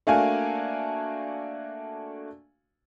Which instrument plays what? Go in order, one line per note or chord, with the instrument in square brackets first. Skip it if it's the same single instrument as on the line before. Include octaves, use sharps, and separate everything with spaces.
[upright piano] A3 A#3 D4 F#4 F5 G#5